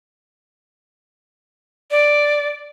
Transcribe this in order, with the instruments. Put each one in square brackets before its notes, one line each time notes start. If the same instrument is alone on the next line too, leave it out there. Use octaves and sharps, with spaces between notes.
[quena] D5